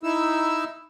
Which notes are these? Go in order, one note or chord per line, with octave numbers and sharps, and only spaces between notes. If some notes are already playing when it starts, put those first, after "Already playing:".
D#4 E4 E6